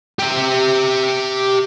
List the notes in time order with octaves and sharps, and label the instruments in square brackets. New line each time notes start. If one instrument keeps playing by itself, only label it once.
[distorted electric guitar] G4 E5